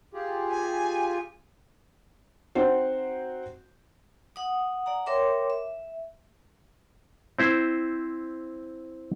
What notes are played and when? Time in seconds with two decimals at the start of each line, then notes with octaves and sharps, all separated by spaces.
0.14 F4 G4 G#4
0.50 G#5
2.55 C4 D#4 F#4 C5
4.36 F#5 D#6
4.86 D5 F#5 A#5
5.06 A#4 C#5 E5 G5 C6 D6
5.50 E5
7.39 C4 E4 C5